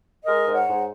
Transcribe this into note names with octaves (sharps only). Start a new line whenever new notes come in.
G#3 A#4 D#5
G#2
C#5 F#5
G#2